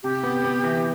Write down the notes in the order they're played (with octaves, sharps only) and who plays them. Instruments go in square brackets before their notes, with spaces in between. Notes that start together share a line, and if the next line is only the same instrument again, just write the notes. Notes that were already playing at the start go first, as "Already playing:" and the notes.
[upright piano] C3 [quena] G4
[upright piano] B3
B3
E3